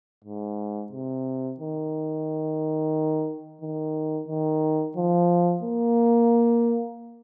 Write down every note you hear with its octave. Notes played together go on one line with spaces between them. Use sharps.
G#2
C3
D#3
D#3
D#3
F3
A#3